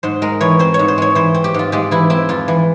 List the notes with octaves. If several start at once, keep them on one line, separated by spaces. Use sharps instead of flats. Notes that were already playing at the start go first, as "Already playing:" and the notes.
G#2 C5
G#3 A#4
E3 C#5
C4 C5
C#5
G#2
C5
G#3 C#5
E3 C5
C4
G4
G#2 F4
G#3 G4
E3 E4
C4 E4
F2 F4
E3